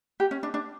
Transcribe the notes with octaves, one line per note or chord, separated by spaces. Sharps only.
G4
C#4
D4
D4